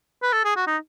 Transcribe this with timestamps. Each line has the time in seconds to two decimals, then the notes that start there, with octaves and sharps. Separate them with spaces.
0.22 B4
0.33 A4
0.44 G#4
0.56 F#4
0.67 D#4